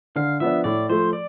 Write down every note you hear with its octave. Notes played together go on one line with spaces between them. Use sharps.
D3 F5
F3 B3 D4 E5
A2 D5
F3 A3 C5
D5